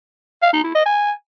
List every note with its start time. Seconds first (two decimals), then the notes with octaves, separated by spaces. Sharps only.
0.43 F5
0.53 D#4
0.64 E4
0.75 D#5
0.86 G#5